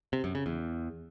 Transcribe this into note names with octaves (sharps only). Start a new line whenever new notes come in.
C3
F#2
C#3
E2